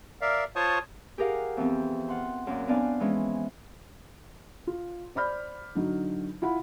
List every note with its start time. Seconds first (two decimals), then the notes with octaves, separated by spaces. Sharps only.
0.21 A#4 D5 E5 F5
0.56 F4 C5 C#5 A5 C#6 D#6
1.18 G4 G#4 A#4 F5 F#5
1.57 F2 E3 B3 C4
2.08 F4 F#5 C6
2.47 F#2 A#2
2.67 B3 C4 D4 D5 F5 G#5
3.00 E3 F3 G#3 C#4 E4
4.67 F4
5.15 C5 D5 B5 F6 G6
5.75 D3 F#3 D#4
6.42 E4 F4 F#5 B5